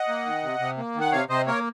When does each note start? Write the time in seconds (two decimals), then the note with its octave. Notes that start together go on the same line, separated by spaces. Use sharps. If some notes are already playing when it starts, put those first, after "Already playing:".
Already playing: D#5 F#5
0.08 A#3
0.25 D#3
0.43 C3
0.60 C3
0.77 A#3
0.95 D#3
1.01 F#5
1.12 C3 C#5 F5
1.29 C3 C5 D#5
1.47 A#3 A#4 C#5